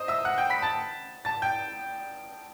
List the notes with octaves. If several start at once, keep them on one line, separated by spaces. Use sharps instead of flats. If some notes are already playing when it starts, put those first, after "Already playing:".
Already playing: C5 D#5 D#6
E5 E6
F#5 F#6
G5 G6
B5 B6
A5 A6
A5 A6
G5 G6